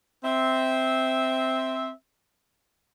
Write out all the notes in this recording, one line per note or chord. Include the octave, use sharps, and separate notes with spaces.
C4 E5